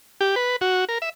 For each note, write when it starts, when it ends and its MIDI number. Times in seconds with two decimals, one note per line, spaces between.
0.21 0.35 67
0.36 0.56 71
0.61 0.85 66
0.89 0.98 70
1.02 1.09 76